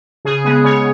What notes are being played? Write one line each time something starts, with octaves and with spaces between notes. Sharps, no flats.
C#3 G#4
G#3 B3 G#4
C#3 C#5